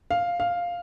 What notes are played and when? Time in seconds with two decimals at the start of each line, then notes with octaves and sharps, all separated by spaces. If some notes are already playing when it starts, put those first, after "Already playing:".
0.11 F5
0.40 F5